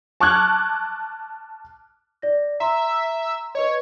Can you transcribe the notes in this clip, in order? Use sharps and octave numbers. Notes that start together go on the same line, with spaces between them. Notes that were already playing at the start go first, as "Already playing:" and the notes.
A5 C#6 D6 F6 F#6 G#6
D5 A#6
E5 A#5 C6 E6
B4 C#5 D#5